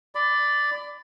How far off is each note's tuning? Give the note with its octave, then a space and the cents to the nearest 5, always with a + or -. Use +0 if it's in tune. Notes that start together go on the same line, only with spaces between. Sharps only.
D5 +0 B5 +25